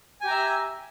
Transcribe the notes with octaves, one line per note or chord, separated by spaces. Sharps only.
G4 E5 G#5 A#5